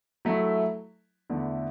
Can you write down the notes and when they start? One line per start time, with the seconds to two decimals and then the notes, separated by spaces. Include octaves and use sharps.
0.25 F#3 A3 E4
1.30 E2 D3 A3 E4